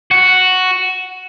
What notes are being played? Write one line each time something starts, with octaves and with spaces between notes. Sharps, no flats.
F#4